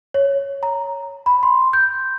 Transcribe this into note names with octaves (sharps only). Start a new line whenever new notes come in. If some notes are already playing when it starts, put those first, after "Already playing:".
C#5
A#5
B5
C6
G6